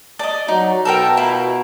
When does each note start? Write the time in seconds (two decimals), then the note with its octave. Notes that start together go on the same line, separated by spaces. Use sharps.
0.19 D5 D#5 A5
0.48 F#3 D#4
0.85 B2 A4 A#4 G5
1.17 E4 F4 A#4